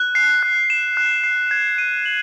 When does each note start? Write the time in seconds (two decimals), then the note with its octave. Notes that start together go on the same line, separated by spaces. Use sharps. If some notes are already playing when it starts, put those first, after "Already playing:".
Already playing: F#6
0.15 C7
0.43 F#6
0.70 E7
0.97 F#6
1.24 C7
1.51 G#6
1.78 D#7
2.06 F#7